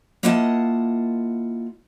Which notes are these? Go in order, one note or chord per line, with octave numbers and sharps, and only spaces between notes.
A#3 E4 F4 D#5 F#5 A5